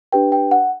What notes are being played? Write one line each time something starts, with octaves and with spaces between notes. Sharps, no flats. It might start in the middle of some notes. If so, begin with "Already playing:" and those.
D4 G4 B4 G5
G5
F#5